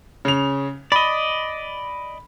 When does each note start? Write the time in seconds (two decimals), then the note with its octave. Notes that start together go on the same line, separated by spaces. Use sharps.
0.25 C#3 F7
0.92 D5 D#5 B5